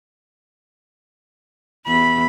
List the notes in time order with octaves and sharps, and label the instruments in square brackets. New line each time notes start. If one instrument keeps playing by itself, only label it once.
[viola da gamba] E2 [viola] B5